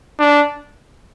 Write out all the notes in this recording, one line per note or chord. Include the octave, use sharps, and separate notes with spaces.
D4